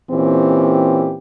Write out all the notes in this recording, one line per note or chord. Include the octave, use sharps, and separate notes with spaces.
A#2 E3 C4 C#4 G4